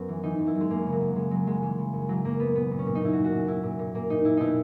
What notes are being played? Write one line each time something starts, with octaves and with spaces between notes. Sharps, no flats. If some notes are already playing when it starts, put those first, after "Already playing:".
Already playing: F#2 B3 C#4
E3
E3 D#4
F#2
E4
F#2
G#3
F#2 A#3
C#3
F#3
F#2
C#3 G#3
C#3 F#3
F#2 G#3
E3 G#3
C#3
F#2
E3 F#3
F#2 A#3
F#2 B3
A#2 B3
A#2
C#4
A#2
D#4
A#2 E4
A#2 F#4
F#4
A#2
A#2 E4
A#2
A#2
A#2 A#3
A#2 D#4
A#2 E4
B2 D#4 E4